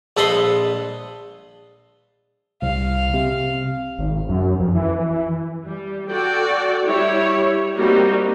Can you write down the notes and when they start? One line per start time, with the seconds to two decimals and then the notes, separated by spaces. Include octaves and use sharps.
0.17 A#1 A4 B4 D#5 B5 C6
2.62 C2 F5
3.14 C3
3.99 G#1
4.29 F#2
4.59 F2
4.75 E3
5.68 G3
6.10 F#4 A4 D5 G5
6.85 G3 E4 G4 C#5
7.76 G3 A#3 C4 D#4 F#4 G4